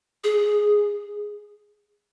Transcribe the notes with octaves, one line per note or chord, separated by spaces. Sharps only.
G#4